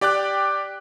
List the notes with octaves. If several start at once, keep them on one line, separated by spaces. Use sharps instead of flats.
G4 D5 G5 D6 F#6